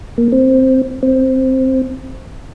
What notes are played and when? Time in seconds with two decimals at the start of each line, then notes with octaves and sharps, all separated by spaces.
0.18 A#3
0.32 C4
1.03 C4